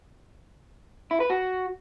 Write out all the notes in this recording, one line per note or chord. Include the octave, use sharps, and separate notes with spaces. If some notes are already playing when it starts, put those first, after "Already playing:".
E4
B4
F#4